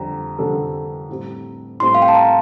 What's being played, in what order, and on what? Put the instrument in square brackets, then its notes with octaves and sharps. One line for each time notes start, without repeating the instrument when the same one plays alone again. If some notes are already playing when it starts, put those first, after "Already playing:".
Already playing: [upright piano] F2 D3 G3 D4 [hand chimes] A#5
[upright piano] F2 D3 G3 D4 A4
A2 G3 C4
[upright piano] A2 G3 C4 [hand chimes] C6
[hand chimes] F5
G5
A5
A#5